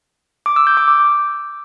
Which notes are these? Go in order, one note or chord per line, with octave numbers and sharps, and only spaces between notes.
D6
E6
G6
D6
D6